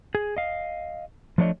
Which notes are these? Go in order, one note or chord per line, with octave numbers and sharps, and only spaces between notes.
G#4
D#5 F5
F3 A3 D4 C#5 D#5